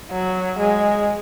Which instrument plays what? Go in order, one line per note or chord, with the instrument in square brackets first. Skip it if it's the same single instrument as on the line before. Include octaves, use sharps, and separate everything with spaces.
[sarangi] F#3
G#3